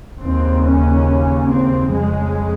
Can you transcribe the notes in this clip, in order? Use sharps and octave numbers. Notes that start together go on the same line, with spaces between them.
D#2 C#3 C4
C#4
C4
F2 C#3 G#3